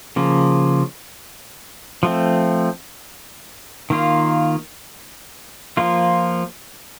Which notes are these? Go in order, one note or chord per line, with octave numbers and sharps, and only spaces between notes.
C#3 F3 A#3
F3 A3 C4
D#3 A#3 F4
F3 A#3 F4